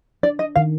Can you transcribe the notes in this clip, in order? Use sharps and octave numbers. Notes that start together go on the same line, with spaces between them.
D4 D5
D#5
D#3 F5